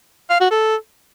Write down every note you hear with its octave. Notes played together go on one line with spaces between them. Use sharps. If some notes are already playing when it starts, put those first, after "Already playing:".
F5
F#4
A4